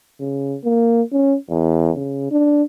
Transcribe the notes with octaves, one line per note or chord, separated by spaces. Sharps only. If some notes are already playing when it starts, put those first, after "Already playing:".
C#3
A#3
C#4
E2
C#3
D4